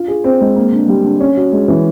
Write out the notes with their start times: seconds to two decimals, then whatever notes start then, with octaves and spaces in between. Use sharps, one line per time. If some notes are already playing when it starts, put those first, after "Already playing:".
Already playing: F4
0.08 G#4
0.24 C4
0.41 G#3
0.56 A#3
0.72 D3
0.88 G3
1.04 D3
1.20 C#4
1.37 F#4
1.52 G#3
1.68 E3